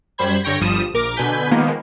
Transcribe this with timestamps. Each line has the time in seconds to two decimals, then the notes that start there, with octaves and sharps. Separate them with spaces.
0.18 F#2 G3 C5 B5 G#6
0.44 G2 D3 C#5 G5 A#6
0.60 G1 F3 G3 D#6 E7
0.94 A#1 A#4 D6
1.16 B2 D3 B4 G#5 G6 B6
1.51 D#3 F3 G#3 A#3 B3